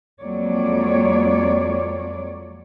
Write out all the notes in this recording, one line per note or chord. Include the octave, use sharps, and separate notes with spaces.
F2 F#3 G#3 A#3 C#5 D5